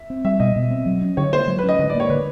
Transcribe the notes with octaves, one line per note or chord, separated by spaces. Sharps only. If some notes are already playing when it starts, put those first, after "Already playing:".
Already playing: E5
C4
G3 E5
B2 D#5
B2
C4
F#3
C#4
D3 C#5
A#3 C5
F#3
C#4 B4
D#5
D3 D#5
D5
A#3 C#5
D3 B4